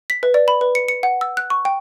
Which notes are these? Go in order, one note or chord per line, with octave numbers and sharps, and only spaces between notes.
B6
B4
D5
B5
B4
C#7
C#7
F#5
E6
F#6
C#6
G5